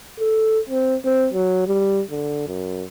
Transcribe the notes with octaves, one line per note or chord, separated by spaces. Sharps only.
A4
C4
C4
F#3
G3
D3
F#2